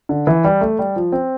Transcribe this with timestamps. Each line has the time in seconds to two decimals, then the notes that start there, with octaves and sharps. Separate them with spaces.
0.09 D3
0.27 E3
0.44 G3
0.61 A3
0.79 G3
0.96 F3
1.12 C4